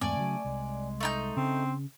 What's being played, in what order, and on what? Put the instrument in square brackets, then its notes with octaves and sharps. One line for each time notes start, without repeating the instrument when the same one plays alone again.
[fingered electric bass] E2 G#2 C4 [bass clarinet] A3 [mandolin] D5 G#5
[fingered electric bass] C#3 F#3
[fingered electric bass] C2 [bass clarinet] G#3
[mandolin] A3 D#4 G6
[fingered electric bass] C#3 [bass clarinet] C4